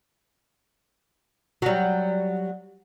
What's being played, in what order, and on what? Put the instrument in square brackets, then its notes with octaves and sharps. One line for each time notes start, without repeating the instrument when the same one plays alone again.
[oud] F#3 G3